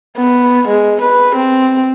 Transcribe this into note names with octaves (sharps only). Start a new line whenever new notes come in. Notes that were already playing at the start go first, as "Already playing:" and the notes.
B3
G#3
B4
C4